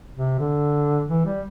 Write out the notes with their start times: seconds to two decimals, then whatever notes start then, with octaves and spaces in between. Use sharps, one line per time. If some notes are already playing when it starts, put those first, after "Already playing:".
0.16 C3
0.39 D3
1.08 E3
1.25 G3